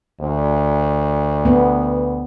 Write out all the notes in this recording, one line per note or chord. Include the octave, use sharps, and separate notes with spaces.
D2
B3